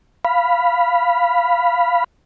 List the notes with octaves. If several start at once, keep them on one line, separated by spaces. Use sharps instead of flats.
F5 B5